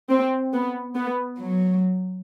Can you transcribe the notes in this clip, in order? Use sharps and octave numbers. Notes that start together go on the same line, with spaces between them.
C4
B3
B3
F#3